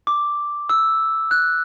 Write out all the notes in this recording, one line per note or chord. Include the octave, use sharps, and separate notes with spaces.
D6
E6
F#6